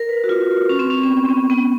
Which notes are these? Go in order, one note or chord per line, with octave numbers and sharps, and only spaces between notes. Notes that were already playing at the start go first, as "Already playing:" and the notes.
Already playing: A#4
B4
F#4
F4
C#4
C4
C#4
C4
B3
C4
B3
B3